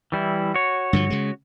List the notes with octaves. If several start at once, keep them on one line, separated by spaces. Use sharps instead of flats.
E3 G3 E4
F#4 C#5
G2 D3 F3
C#3 G#3